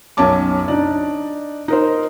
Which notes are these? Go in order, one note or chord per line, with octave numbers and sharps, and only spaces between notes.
B1 F#2 C#4 C#5 A5 D6
D4 D#4 D5
D#4 A#4 C5